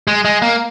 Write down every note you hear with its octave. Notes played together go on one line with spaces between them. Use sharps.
G#3
G#3
A#3